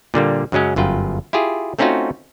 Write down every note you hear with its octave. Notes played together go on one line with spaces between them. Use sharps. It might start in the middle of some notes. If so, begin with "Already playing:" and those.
A#2 D3 G3 A#3
F#2 C#3 F#3 G#3 C#4
G1 F#2 F4 B4 G5
E4 F4 G4 G#4
A3 C4 C#4 D#4 F4 F#4